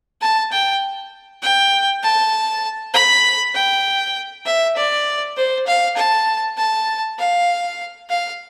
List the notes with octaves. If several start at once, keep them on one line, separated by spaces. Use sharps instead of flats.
A5
G5
G5
A5
B5
G5
E5
D5
C5
F5
A5
A5
F5
F5